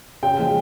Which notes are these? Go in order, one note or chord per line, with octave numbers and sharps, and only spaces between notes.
C#3 G5
F3 G#3